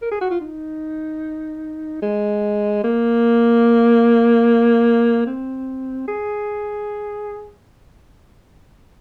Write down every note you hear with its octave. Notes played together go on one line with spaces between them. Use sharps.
A#4
G#4
F#4
F4
D#4
G#3
A#3
C4
G#4